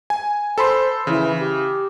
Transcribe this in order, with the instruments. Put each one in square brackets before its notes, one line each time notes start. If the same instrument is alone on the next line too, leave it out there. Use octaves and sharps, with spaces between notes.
[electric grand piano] G#5
[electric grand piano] A4 B5 C6 [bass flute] C5
[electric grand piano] C#3 [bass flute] E3
[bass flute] G4